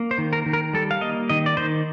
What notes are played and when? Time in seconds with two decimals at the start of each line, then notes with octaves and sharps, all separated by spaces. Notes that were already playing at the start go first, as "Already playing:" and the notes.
Already playing: A#3
0.11 C5
0.18 D#3
0.33 A#4
0.46 D#3
0.53 A#4
0.73 G3 A4
0.91 F5
1.01 A#3 D#5
1.29 D#3 D#5
1.46 D5
1.57 D#3 C5